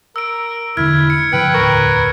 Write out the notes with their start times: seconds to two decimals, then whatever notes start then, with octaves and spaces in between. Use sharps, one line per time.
0.16 A#4 E6 D7
0.77 E1 D3 E4 F6 G#6
1.10 C#7
1.33 G2 C#3 F3 B4 G5 G#6
1.54 E1 D2 A2 A#4 C#6